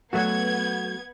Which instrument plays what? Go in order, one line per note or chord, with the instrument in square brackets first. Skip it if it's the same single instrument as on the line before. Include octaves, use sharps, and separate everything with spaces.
[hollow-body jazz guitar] F#3 A3 F#4 [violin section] B3 G#6